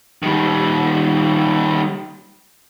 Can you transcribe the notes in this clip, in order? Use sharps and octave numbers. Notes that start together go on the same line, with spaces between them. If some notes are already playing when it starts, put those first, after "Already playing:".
D#3 G3